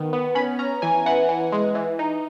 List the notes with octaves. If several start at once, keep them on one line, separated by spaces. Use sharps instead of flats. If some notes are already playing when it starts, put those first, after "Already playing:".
Already playing: D#3 B3
B3
C#4 B5
C#4 A#5
E3 G#5
E3 F#5
E3
G#3
E3
D#4